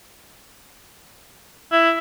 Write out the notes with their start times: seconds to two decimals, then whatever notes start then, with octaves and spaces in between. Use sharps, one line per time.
1.72 E4